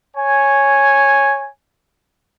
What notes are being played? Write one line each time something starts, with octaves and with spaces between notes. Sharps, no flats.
C#5 G#5